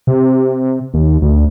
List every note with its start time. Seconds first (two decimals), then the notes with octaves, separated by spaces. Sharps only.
0.07 C3
0.94 D#2
1.22 D2